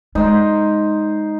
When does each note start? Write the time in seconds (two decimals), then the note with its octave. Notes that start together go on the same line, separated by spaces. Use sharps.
0.15 G#3 D#4 C5